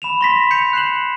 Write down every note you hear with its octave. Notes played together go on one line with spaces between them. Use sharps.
B5 E7 F7
C6 A#6 B6
G6 B6 C#7 F7
F#6 C7 E7 F#7